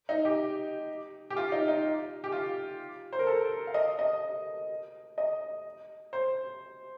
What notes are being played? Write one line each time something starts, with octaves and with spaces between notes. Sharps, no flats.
D#4
G4
G4
F4
D#4
D#4
G4
F4
C5
A#4
A4
F5
D#5
D#5
D#5
C5